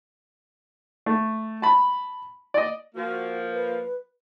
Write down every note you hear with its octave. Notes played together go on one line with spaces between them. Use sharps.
A3
A5 B5
D5 D#5
F3 A#3 F#4
B4